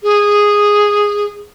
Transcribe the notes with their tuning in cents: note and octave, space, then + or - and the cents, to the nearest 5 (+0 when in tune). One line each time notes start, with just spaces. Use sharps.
G#4 -10